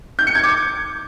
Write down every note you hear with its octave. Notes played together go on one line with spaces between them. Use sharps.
G6
C#7
G#6
D6